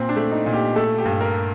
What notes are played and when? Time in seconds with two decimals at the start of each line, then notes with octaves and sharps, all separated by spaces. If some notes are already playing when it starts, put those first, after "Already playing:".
Already playing: A#2 C4
0.09 D4
0.16 A3
0.31 D#4
0.46 A#2
0.54 G4
0.76 A3 A4
0.98 G4
1.05 G2
1.21 A#4